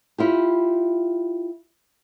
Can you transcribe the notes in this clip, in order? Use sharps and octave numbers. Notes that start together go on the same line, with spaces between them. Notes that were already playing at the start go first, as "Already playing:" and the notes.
E4 F4 G4